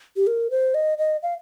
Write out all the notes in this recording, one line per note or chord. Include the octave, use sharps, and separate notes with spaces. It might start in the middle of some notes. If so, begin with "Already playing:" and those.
G4
A#4
C5
D#5
D#5
F5